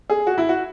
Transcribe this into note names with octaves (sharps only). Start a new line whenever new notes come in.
G#4
F#4
E4
F#4